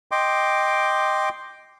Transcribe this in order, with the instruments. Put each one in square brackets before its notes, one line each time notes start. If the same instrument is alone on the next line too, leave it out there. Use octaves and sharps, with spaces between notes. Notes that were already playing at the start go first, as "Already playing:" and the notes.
[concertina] D#5 G5 C6 D6